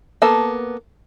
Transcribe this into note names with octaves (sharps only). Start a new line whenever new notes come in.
A#3 B3 A4 A5